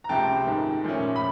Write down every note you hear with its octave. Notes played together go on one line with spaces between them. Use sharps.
A#5
C#2 C3 F3 A3 C4 G5 A5
G#2 D#3 G#3
A#2 F3 A3 C#4
B5